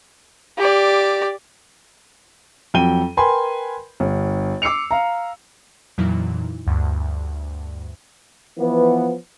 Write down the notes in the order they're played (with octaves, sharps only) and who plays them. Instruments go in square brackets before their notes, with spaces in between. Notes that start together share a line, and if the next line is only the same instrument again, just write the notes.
[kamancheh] G4 D5
[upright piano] F2 F#3 G5 D#7 G7
A#4 B4 G5 G#5 B5 C6
G1
D6 E6 C7 C#7 F7
F5 A#5
[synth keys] F2 A#2 E3 F#3 D#4 E4
D2 G2
[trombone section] E3 F3 B3